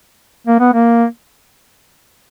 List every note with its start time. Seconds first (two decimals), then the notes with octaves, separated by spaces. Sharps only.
0.47 A#3
0.60 B3
0.73 A#3